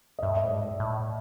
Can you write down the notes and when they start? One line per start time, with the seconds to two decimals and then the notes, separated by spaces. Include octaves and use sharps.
0.19 D#5
0.22 G2 E5
0.37 D#5
0.43 A2
0.50 G#2 D5
0.80 A2